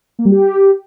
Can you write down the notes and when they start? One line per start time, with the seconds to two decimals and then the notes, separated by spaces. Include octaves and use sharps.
0.19 A#3
0.25 G3
0.32 G4